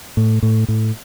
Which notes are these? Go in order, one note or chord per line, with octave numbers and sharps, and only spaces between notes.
A2
A2
A2